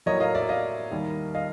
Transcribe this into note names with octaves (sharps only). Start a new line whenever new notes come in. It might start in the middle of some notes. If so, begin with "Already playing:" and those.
A2 F#3 A#3 C#5 D#5
D#5 F5
D5 E5
D#5 F5
D#2 D#3 G3 A#3
D#5 F5